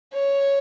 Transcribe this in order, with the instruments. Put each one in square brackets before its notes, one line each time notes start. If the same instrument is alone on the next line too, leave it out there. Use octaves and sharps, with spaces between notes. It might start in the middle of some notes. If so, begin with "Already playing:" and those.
[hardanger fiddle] C#5